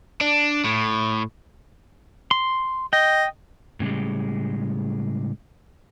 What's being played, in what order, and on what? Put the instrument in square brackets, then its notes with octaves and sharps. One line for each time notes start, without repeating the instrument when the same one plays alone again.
[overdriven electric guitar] D4
A2
[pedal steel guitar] C6
[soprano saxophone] D#5 [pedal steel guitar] G5
[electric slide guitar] A2 C#3 G3 G#3